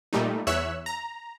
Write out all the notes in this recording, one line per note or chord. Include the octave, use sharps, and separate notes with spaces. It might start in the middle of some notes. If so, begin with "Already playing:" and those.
A#2 G3 A3 D#4
E2 C#5 E5 E6 F#6
A#5